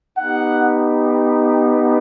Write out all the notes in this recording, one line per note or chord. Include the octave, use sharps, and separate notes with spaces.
B3 D#4 G4 F#5